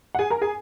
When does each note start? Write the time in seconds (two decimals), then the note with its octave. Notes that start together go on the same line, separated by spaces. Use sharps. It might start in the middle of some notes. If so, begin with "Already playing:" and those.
0.15 F#5
0.19 G#4 G#5
0.30 A#4 A#5
0.41 G#4 G#5